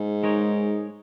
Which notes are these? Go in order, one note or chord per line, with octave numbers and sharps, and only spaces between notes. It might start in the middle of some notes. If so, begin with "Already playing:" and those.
Already playing: G#2
G#3 D#4 A#4 C#5